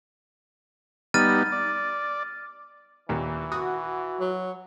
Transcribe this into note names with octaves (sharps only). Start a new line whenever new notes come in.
G3 B3 D#4 F6 A6 D#7
D5
D#2 A#2 E3
F#4 D#6
F#3